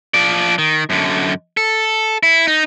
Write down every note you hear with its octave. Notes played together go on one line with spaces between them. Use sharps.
F3 D5
D#3
F#2 D3
A4
E4
D#4